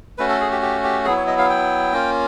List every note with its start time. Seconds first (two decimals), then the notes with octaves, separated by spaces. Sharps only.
0.18 A3 C#4 F#4 B4
0.29 A4
0.40 G#4
0.52 G4
0.62 G4
0.84 G4
1.05 F#3 B3 E4 G#4
1.16 C#5
1.27 D#5
1.38 F5
1.50 G5
1.93 A#3 C#4 F4